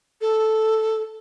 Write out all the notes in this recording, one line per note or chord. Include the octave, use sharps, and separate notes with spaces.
A4